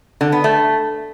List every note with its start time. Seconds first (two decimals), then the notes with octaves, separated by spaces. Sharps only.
0.21 D3
0.32 B3
0.44 A3